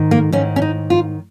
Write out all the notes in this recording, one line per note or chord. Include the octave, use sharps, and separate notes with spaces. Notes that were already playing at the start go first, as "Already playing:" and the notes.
Already playing: G#2 D#3
A#3
G#2 D#3 C#4
C#4
D#4
F4